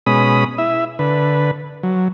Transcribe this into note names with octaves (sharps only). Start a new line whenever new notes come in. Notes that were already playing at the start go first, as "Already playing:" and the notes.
B2 G#3 C#4 B5 D#6
E4 E5
D3 B4
F#3